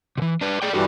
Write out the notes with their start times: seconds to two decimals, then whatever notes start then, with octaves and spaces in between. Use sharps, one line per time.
0.17 C3 E3
0.41 D4 B4
0.62 G#4 D5 G5
0.73 G2 E3 G3 F#4 A4